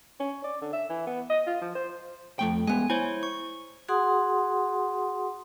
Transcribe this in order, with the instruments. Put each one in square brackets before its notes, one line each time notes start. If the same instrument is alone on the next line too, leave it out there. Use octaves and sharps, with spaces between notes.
[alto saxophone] C#4
D5
D3
E5
E3
B3
D#5
F4
F3
C5
[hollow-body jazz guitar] F2 A3 G5
[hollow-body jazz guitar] G#3 B3 [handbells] G#5
[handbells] E4 C5 C#5 [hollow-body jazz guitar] G#5
[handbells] C#6
[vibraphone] F#4 G#4 F#5 C6 D#6